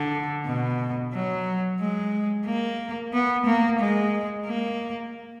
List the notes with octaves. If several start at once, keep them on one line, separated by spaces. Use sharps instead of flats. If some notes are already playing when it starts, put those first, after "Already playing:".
Already playing: D3
B2
F#3
G#3
A#3
B3
A#3
G#3
A#3